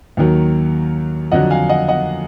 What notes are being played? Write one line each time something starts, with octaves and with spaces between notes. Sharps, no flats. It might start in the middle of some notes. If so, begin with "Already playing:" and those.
D#2 D#3 F#3
F2 D3 F#3 D#5 F#5
F5 G#5
D#5 F#5
D#5 F#5